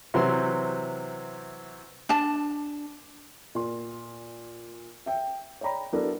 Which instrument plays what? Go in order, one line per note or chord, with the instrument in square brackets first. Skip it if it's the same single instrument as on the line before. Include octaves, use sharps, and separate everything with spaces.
[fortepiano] C3 E3 F#3 C4 C6
[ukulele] D4 A5
[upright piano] A#2 C6
E5 G5
C#5 D5 G5 A#5 B5
F#3 B3 D4 E4 A4 A#4